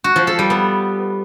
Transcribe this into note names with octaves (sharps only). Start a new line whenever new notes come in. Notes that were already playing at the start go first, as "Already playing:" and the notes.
F#4
F3
A4
G3
B3